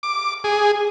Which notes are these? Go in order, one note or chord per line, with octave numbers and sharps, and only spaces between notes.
D6
G#4